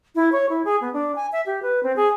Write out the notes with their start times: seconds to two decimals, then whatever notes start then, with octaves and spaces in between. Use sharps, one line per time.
0.15 E4
0.32 C#5
0.49 E4
0.65 G#4
0.81 B3
0.93 D4
1.16 G#5
1.32 E5
1.46 G4
1.62 B4
1.83 C4
1.96 G#4